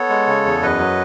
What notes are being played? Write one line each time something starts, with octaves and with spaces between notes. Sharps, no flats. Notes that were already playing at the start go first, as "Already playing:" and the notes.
Already playing: B3 A4 C#5
G#3
C#3
E2
F#2 B4 D#5
F#3